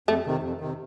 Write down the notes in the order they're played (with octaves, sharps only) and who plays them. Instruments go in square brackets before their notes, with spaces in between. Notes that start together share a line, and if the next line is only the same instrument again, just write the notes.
[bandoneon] F2 [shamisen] A3
[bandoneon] C3 D#3
F2
C3 D#3